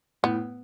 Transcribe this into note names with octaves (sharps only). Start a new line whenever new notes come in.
A2 B3